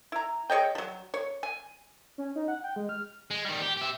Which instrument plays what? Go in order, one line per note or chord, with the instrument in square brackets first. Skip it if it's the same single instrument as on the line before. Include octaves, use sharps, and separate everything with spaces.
[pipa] E4 A#5
G#4 C#5 D#5 G5
F3 F#3
C#5
G#5
[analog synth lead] C#4
D#4
F#5
G5
G#3
F6
[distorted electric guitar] G#3
D#3 G3
G4
G4 E5